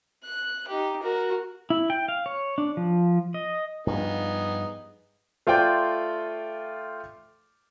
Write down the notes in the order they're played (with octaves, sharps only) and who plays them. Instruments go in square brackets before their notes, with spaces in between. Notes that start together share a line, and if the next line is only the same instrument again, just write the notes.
[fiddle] F#6
D#4 G4
F#4 A#4
[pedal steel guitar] E4
G5
F5
C#5
D4
F3
D#5
[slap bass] G2 F3 [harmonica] B3 D#4 G#4
[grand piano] A3 F4 C5 D5 G5